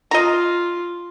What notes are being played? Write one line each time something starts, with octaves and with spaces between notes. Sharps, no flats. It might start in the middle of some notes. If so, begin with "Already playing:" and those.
F4 D#5 A#5